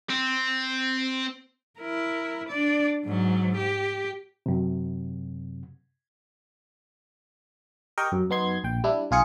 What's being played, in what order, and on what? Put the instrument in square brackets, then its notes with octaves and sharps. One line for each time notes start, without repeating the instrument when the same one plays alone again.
[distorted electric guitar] C4
[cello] E4 A#4
D4 D5
G#2 F#3
G4
[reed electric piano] F#2 C3
[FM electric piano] G4 A#4 D#5 G5 C#6
F#2
F#2 B3 D#4 C6 G#6
A#1 G5
G3 D4 E4
B1 F4 G#4 C#7